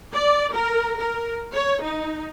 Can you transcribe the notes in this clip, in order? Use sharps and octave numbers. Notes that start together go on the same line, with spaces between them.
D5
A#4
A#4
C#5
D#4